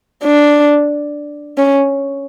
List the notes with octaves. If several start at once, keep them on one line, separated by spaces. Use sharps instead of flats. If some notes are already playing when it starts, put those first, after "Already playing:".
D4
C#4